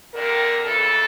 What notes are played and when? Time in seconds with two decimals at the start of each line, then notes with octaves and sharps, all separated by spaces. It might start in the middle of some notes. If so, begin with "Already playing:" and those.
0.14 F2 D3 G3 A#4
0.65 F2 C#3 E3 A4